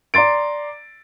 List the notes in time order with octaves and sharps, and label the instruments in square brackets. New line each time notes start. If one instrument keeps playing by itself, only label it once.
[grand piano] D5 A#5 C6 A6 D7